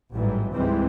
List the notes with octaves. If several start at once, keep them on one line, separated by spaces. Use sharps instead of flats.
A1 G#2 E3 F#3 G3
C#2 G#2 E3 G3 G#3 C4